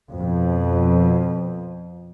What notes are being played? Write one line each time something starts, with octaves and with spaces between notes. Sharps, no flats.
F2 B2